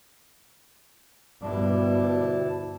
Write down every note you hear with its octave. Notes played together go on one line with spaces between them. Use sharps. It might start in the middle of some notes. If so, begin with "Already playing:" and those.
D2 G2 B2 D4 E4 A5